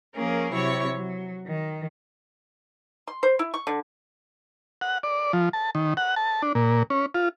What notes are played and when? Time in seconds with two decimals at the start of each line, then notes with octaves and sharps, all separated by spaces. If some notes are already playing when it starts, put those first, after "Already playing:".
0.16 F3 A#3 C#4 G#4 A#4
0.51 C3 F#3 E4 C#5 C#6
0.92 F#3
1.45 D#3
3.07 C6
3.23 C5
3.39 E4
3.54 C#6
3.67 D3
4.81 F#5
5.03 D5
5.33 F3
5.53 A5
5.75 D#3
5.97 F#5
6.16 A5
6.42 D4
6.55 A#2
6.90 C#4
7.14 F4